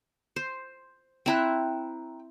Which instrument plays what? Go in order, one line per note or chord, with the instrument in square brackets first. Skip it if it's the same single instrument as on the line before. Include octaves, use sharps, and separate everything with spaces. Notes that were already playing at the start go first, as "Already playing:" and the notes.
[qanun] C5
[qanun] C4 E4 [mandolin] G5 A#5 F#6